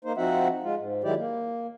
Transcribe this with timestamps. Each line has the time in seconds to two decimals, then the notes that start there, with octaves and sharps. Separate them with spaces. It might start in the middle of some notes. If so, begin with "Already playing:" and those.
0.05 A#3 D#4 C5
0.17 F3 C4 D#4 F#4 E5 F#5
0.63 G#3 F4
0.78 G#2
1.04 D#3 F#3 G#3 E4 G4 D5
1.18 A#3